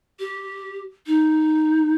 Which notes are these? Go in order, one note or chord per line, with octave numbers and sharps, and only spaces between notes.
G4
D#4